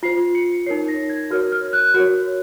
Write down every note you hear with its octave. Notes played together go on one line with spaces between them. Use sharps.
F4 C5 C7
C#7
D#4 A#4 C#5 C7
A#6
G#6
F#4 A#4 C#5 F6
F6
F#6
F#4 A#4 C#5